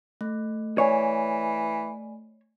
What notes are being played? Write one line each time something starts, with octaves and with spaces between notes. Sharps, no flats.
A3
E3 C#5 D5 G#5